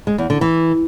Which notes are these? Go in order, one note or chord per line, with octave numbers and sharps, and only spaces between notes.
G#3
E2
D3
E3